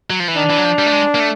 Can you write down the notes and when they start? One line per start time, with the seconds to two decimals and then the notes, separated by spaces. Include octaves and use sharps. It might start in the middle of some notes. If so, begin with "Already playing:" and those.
0.10 F#3
0.20 F3
0.28 E3
0.37 D#3 D4
0.50 E3
0.58 F#3
0.64 F3
0.79 G3
0.86 A3
0.93 G#3
1.15 A#3
1.20 A3